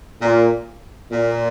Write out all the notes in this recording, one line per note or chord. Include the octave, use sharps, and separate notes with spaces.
A#2
A#2